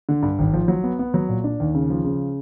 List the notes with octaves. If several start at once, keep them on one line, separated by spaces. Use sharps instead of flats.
D3
G2
G#1
F3
F#3
B3
B3
F#3
A#2
D4
D#2
C#3
F3
C#3